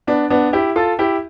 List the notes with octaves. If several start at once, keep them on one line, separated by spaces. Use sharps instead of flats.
B3 D4
B3 D4
E4 G4
F4 A4
E4 G4